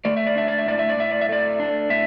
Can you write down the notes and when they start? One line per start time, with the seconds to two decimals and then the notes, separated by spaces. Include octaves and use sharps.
0.05 A3 D5
0.17 E5
0.27 D5
0.36 D4 E5
0.48 D5
0.58 E5
0.66 A2 D5
0.79 E5
0.89 D5
0.97 A2 E5
1.11 D5
1.21 E5
1.29 A3 D5
1.60 D4
1.89 A2 E5